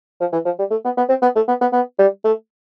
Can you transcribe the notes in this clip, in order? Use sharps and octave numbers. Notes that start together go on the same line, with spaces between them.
F3
E3
F3
G3
A3
B3
B3
C4
B3
A3
B3
B3
B3
G3
A3